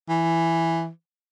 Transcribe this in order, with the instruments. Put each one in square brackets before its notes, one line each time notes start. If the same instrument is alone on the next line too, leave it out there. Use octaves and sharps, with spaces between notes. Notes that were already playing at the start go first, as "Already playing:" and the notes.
[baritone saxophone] E3